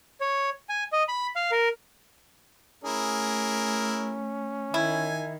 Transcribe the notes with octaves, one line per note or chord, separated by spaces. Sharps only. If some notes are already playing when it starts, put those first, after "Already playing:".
C#5
G#5
D#5
B5
F5
A#4
A3 C#4 E4 G#4 A#4
D#3 E4 G#5